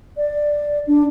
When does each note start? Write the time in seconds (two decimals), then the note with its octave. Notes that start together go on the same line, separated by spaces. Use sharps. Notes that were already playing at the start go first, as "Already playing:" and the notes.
0.17 D5
0.87 D4